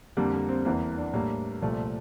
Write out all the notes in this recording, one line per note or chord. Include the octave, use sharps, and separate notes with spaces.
F2 D3 G3 A#3
A#3
C4
E2 E3 A#3 C4
D4
A2 G3 A#3
C2 A#2 F3 A3